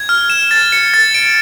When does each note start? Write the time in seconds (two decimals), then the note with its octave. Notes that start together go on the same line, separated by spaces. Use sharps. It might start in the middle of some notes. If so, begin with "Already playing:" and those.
Already playing: G#6
0.09 F6
0.30 E7
0.51 A6
0.72 C#7
0.94 A6
1.15 D7